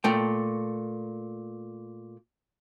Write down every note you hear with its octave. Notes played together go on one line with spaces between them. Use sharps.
A#2 A3 G5